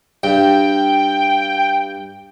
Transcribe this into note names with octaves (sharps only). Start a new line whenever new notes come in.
G2 G5